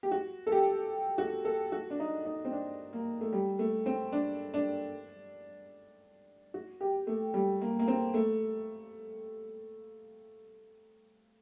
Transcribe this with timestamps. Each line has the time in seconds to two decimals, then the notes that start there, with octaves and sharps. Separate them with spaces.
0.03 G4
0.11 F#4
0.47 A4
0.52 G4
1.18 F#4
1.45 A4
1.72 F#4
1.90 D4
2.00 D#4
2.25 D#4
2.45 C4
2.52 D4
2.93 A#3
3.21 A3
3.33 G3
3.59 A3
3.86 C4
4.12 D4
4.54 D4
6.54 F#4
6.81 G4
7.07 A3
7.34 G3
7.61 A#3
7.79 A#3
7.88 C4
8.14 A3